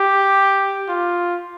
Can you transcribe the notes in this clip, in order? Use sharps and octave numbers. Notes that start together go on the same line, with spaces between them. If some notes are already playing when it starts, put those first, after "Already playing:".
Already playing: G4
F4